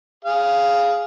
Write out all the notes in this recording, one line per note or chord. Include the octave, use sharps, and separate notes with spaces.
G#4 F5